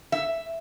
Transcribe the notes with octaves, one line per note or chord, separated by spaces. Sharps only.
E5